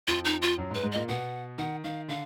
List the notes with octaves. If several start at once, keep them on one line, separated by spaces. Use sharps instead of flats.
F2 F3 F4
D#4
F4
F#2 F#3
G#2 G#3
B4
G#2 G#3
A#2 A#3 D#5
B2 B3 F#5
D#3 F#5
D#3 F5
D3 F5